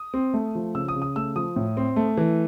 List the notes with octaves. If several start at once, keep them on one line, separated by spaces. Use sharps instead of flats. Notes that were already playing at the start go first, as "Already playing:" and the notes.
Already playing: D#6
C4
A3
F3
C#3 E6
D#6
C#3
D#6
A3 E6
F3 D#6
A2
C4
A3
E3